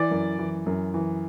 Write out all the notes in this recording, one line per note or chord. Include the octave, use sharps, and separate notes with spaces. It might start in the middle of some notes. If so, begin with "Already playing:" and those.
Already playing: E3 D5
F#2
E3
F#2
E3